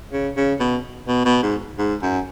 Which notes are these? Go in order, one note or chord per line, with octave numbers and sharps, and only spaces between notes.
C#3
C#3
B2
B2
B2
G#2
G#2
F#2